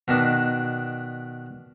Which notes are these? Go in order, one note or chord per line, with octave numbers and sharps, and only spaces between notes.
B2 D#3 D4